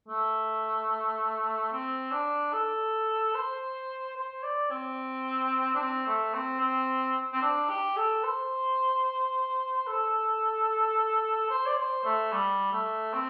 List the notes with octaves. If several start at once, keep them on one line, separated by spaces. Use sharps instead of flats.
A3
C4
D4
A4
C5
C5
D5
C4
D4
C4
A3
C4
C4
C4
D4
G4
A4
C5
A4
C5
D5
C5
A3
G3
A3
C4